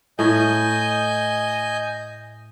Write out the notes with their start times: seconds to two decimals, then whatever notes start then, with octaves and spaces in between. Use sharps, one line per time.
0.19 A2 D#5 G#5 G6